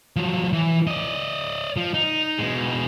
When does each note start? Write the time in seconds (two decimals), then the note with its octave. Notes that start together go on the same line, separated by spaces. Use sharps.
0.16 F3 F#3
0.53 E3
0.87 D5 D#5
1.77 F3
1.94 D#4
2.38 B2 G#3